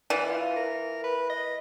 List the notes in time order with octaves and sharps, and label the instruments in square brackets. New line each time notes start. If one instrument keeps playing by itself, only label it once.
[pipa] E3 [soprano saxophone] D5
[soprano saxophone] F4
A#4
B4
D#5